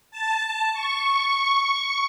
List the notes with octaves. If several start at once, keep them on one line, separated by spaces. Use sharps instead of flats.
A5
C#6